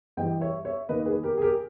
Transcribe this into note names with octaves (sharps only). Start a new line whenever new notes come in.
G2 E3 G3 D#5 G5
C#5 E5
C#5 E5
D#2 D#3 A#3 B4 D#5
G#4 B4
G4 A#4
G#4
G4 A#4